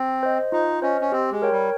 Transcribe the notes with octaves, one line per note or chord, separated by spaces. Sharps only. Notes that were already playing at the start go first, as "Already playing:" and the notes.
Already playing: C4
C5 D#5
D#4 F4
C#4 C5 D#5
C#4
C4 G4
G#3
A#4 C#5 G5
G3